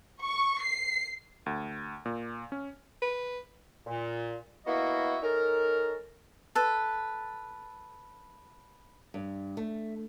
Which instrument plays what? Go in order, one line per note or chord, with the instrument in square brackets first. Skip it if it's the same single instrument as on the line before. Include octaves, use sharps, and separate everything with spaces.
[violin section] C#6
C7
[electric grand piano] D2
A#2
C#4
[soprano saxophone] B4
[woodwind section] A#2
A#3 B3 E4 F#4 D#5 E5
C#4 D#4 A4 A#4
[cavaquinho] A4 B4
[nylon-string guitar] G2
A3